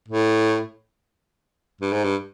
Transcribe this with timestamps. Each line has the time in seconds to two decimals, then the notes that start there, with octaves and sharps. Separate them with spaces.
0.08 A2
1.81 G2
1.93 G#2
2.04 G2